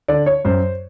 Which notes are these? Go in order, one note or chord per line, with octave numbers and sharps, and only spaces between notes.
D3 D5
C#5
F#2 C5